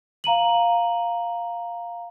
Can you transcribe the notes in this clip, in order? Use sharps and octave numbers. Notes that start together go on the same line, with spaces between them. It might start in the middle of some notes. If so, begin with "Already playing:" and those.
F5 A#5 D#7 F#7